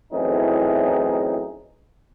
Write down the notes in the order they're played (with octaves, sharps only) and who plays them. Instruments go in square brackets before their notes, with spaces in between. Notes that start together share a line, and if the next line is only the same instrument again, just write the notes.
[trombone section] F#2 A2 E3 C4 D#4 G#4